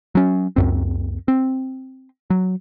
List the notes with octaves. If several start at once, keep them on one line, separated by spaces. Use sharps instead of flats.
F#3 C#4
C#2 F#2 C4
C4
F#3